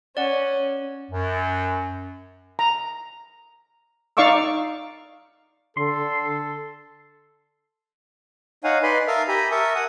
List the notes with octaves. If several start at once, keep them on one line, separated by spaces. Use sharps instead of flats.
C#4 D5 F#5
F#2
A#5
D#4 D5 F5 C#6 D6 E6
D3 A4 C6
D#4 C#5 F5 F#5 G#5
D#4 B4 D5 G#5 B5 C6
A#4 E5 F5 A5 D#6 F6
G4 G#5 A#5 B5
A#4 E5 A5 C#6 D#6
F#5 G#5 D#6